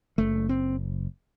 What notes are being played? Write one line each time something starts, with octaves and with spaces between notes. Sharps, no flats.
F#1 A3
C4